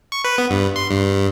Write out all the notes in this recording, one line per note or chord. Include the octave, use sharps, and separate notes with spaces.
C#6
B4
B3
G2
C6
G2